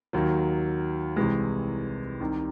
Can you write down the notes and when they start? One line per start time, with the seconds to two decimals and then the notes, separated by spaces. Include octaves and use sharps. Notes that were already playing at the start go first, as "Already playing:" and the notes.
0.13 D#2 D#3 F#3
1.16 C2 C3 E3 G#3
2.20 C2 C3 D#3